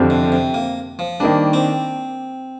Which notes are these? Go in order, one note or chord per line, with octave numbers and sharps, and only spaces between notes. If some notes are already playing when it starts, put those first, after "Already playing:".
Already playing: F2 D3 F3 C4 G4
C3
C3
A#3
F3
D#3 G3 A#3 D4
C4